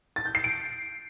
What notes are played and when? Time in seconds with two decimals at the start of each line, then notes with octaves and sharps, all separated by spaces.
0.16 A6
0.26 G6
0.35 C7
0.44 D7